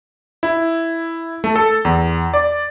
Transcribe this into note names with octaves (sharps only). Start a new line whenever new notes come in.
E4
A3
A4
E2
D5